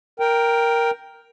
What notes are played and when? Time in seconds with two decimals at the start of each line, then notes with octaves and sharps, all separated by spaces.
0.20 A#4 G5